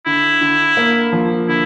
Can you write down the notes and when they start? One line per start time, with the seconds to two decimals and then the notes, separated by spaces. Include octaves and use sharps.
0.06 D3 E4
0.41 D3
0.77 A#3
1.13 F3
1.48 D3 E4